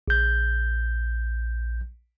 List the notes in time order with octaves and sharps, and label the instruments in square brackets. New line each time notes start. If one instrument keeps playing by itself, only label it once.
[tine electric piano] A#1 G6